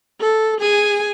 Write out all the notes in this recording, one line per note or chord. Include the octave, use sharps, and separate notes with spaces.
A4
G#4 G#5